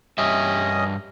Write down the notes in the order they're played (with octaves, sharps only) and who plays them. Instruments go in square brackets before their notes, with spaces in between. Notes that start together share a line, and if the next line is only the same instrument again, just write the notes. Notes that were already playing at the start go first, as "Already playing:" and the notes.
[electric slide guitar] G2 G3 E5 [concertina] C#4 D#5 D#6